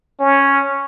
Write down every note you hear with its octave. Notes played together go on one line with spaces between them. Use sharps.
C#4